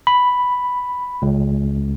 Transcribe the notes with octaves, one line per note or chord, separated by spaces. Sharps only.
B5
C#2